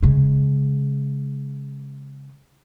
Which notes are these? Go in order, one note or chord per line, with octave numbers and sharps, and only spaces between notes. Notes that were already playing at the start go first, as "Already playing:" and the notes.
C#3 G#3